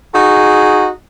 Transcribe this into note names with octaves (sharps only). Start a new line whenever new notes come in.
D#4 F#4 G#4